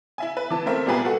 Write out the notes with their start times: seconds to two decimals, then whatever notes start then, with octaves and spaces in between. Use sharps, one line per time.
0.18 E4 E5 G#5
0.37 B4
0.50 E3 A5
0.66 A3 C4 A#4 E5
0.86 A#2 G3 B3 G#4 B4 G5
1.05 F#4 A4 F#5